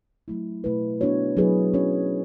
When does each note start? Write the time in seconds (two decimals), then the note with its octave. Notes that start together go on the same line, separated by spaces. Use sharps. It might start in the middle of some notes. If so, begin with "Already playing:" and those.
0.28 F#3 A3 E4
0.64 B2 A3 E4 B4
1.01 B3 D4 F#4 C#5
1.37 F#3 B3 E4 G#4 B4
1.74 F#3 C#4 F#4 C#5